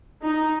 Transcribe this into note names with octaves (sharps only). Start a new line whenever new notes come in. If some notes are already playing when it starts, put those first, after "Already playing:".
D#4